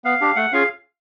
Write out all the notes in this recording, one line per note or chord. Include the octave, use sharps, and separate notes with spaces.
B3 F5
D4 G4
A3 F#5
C#4 F4 G#4 F5